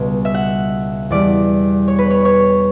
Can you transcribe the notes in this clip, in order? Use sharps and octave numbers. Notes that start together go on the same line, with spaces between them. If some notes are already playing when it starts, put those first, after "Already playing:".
Already playing: C#2 B2 G3
E5
F#5
E2 B2 G3 D5
C#5
B4
C#5
C#5